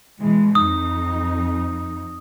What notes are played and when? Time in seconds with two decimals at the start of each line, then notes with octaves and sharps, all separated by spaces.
0.21 B2 E3 G#3
0.55 F2 D#4 D#6